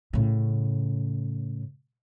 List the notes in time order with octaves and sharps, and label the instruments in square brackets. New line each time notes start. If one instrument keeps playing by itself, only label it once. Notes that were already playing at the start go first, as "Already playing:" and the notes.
[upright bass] A2 C#3